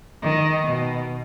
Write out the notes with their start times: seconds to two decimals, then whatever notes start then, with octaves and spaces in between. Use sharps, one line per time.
0.22 D#3
0.64 B2